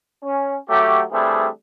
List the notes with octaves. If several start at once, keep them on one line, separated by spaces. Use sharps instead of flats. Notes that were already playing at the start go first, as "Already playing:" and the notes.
C#4
F#3 A3 G4
E3 G3 A3 C4 D4 G#4